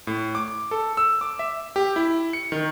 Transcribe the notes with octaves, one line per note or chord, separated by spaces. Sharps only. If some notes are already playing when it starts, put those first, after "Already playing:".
A2
D6
A4
E6
D6
E5
G4
E4
C#7
D#3